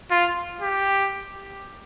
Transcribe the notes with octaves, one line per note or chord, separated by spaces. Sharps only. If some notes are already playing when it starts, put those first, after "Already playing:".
F4
G4